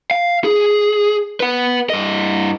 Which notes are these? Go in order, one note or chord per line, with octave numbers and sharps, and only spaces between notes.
F5
G#4
B4 F#5
G2 D#5